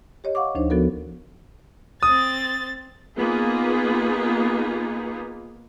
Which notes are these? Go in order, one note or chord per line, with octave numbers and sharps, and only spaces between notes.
G4 C#5 D#5
F5 F#5 C#6 D6
D2 F3 D4 D#4 C5
F3 B3 F#4 A4 A#4
C4 D#6 A6
A#3 B3 D#4 F4 G#4